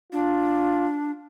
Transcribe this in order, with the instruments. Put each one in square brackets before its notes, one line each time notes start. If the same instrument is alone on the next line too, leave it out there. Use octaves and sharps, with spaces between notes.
[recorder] D4 [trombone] F4